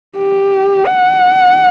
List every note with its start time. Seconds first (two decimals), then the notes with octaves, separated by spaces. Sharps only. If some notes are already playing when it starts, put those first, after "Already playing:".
0.17 G4
0.87 F#5